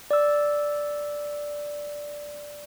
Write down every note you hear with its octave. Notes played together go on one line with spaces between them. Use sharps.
D5 E6